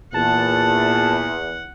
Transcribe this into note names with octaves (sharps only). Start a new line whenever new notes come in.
E2 A#2 F#5 A5